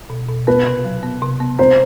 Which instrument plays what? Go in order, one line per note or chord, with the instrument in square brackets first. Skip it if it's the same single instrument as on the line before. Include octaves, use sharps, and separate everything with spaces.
[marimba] B2
B2
[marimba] B3 [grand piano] B4
[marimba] C3
F#3
B3
C3
B3
[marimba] C4 [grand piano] C5